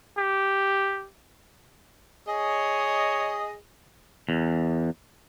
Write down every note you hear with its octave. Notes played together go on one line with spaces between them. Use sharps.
G4
G#4 C#5 D#5
E2